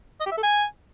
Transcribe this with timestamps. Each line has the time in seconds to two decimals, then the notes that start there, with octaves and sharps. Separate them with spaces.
0.20 D#5
0.26 G4
0.32 E5
0.37 A4
0.43 G#5